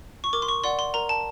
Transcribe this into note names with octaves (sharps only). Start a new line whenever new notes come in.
C#6
A#4 D6
C6
C#6
D5 F#5 C6
C6
A#4 A#5
A5